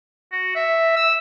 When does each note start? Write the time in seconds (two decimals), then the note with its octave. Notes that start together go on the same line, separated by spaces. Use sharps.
0.32 F#4
0.55 E5
0.96 E6